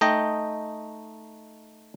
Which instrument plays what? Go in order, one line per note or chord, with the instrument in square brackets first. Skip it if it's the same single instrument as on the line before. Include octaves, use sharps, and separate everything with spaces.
[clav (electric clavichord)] A3 D#4 D#5 G5